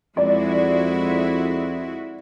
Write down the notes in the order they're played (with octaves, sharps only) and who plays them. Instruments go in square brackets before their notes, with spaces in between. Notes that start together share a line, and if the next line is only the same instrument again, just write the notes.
[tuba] F2 [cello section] G#3 E4 F#4 [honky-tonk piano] D5